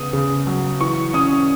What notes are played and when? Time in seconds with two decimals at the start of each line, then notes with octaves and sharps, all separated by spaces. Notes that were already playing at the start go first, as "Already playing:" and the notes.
Already playing: C#3 B3 D#6
0.13 C#3
0.47 F#3
0.81 E3 C#6
1.13 C#4 D#6